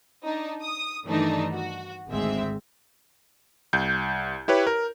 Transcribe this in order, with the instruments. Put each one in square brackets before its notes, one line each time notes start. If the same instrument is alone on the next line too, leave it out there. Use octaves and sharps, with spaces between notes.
[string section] D4 D#4
D#6
G2 D#3 E3 A3 D4 D#4
F#4
G#1 D2 G#2 G#3 C4 E5
[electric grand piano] C2 G6
E4 G4 B4 C#5
A#4